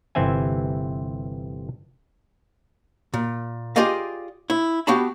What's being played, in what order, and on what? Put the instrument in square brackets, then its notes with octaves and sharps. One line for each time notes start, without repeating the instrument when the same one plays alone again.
[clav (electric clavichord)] G1 C3 E3 C4 E5 G#5
[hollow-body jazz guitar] A#2
F4 G4 G#4 D5 D#5 F5
E4
B3 F#4 G4 F5 A5 B5